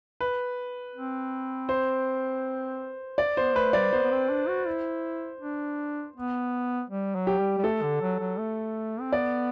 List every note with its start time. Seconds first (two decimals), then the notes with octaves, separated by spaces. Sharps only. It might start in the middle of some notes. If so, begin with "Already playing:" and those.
0.21 B4
0.95 C4
1.69 C5
3.18 D5
3.37 B3 C5
3.55 A3 B4
3.73 G3 D5
3.93 B3 C5
4.03 B3
4.11 C4
4.30 D4
4.48 F#4
4.67 E4
5.40 D4
6.16 B3
6.90 G3
7.15 F#3
7.27 G4
7.39 G3
7.58 G3
7.64 A3 A4
7.83 D3
8.01 F#3
8.20 F#3
8.39 A3
9.01 C4
9.13 B3 D5